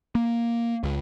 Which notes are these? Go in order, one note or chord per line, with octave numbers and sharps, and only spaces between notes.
A#3
C#2